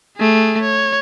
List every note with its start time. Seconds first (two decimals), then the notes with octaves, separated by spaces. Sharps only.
0.16 A3 G#4
0.61 C#5